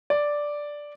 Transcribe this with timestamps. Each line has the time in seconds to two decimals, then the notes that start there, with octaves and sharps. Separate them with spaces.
0.10 D5